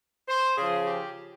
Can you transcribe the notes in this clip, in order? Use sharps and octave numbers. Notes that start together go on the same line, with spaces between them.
C5
C#3 F3 G#4
G4